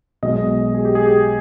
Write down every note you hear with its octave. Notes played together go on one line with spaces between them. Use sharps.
B1 B2 G#3 D#5
G#4
G4
G#4
G4